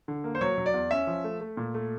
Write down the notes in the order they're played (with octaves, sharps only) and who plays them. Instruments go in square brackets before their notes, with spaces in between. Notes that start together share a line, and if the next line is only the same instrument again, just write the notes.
[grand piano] D3
A#3
C5
F#3 C#5
F#3
D5
E2
C#4 E5
F3
A3
A3
A#2
A3